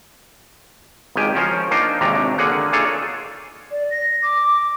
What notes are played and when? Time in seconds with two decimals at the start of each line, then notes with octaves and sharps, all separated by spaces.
1.16 G#1 C#2 D#3 G4 G5 G#5
1.35 F3 C#4 A#4 C5
1.71 A#3 D4 D#4 F4 C5 G5
2.01 G#1 D#2 C3 C#4 D4 A#5
2.38 D3 A#3 G#4 F#5
2.73 D4 D#4 F4 G#4 A4 C#5
3.71 D5
3.91 A#6
4.22 D6